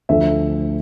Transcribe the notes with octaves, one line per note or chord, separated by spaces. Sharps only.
D2 D3 F3 A3 E5